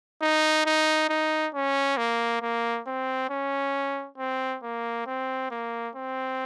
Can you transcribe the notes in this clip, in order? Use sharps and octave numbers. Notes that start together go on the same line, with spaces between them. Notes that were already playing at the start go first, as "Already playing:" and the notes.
D#4
D#4
D#4
C#4
A#3
A#3
C4
C#4
C4
A#3
C4
A#3
C4